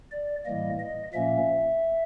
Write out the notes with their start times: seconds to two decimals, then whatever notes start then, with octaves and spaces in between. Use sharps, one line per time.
0.12 D5
0.46 A2 E3 G3 A#3 D#5
0.80 D#5
1.13 A#2 F3 A#3 C#4 E5